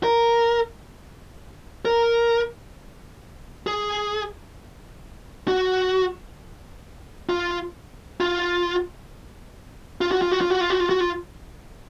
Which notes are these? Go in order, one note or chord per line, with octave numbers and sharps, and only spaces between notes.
A#4
A#4
G#4
F#4
F4
F4
F4
F#4
F4
F#4
F4
F#4
F4
F#4
F4
F#4
F4